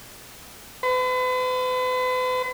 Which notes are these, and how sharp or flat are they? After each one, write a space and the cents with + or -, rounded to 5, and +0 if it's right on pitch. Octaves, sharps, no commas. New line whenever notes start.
B4 +40